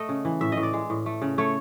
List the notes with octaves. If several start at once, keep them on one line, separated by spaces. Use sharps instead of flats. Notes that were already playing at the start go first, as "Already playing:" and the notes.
Already playing: A3 D#5
C#3
E3
A2 E5
D#5
A2
D5
G#3
A2
A3
C#3
A3 C#5